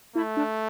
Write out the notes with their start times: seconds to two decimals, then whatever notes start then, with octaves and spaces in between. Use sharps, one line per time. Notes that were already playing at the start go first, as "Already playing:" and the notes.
0.16 A3 E4
0.37 D4